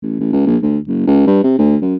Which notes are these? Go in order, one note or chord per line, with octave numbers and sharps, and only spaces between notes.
A1
A1
C#2
A#1
D2
F#1
C#2
G2
C3
D2
F#2